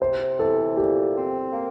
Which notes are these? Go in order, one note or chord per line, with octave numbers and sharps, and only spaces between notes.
C3 C5
E3 A4
A#2 G4
C4
A#3